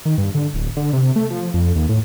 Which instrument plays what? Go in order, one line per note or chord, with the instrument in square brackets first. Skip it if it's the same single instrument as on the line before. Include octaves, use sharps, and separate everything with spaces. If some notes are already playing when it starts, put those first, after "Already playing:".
[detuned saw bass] D#3
G2
D3
D1
D3
C3
A3
F3
F2
D#2
A2